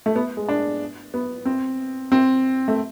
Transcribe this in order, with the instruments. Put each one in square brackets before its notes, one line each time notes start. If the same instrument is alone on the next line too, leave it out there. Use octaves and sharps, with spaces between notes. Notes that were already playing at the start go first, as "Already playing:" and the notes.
[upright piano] A3
B3
G#3
D4
B3
C4
C4
A3